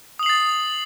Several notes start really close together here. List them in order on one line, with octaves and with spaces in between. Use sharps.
D#6 F#7 C7 A6